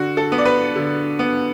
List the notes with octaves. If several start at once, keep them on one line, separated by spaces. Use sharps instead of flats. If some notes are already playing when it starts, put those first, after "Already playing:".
Already playing: D3 F#4
A4
B3
D5
B4
D3
B3